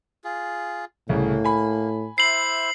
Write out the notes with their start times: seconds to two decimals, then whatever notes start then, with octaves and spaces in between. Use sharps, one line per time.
0.24 F4 G#4
1.09 C2 A2 C#3 A#3
1.44 G#5 B5
2.18 E4 C5 E5 C7 F#7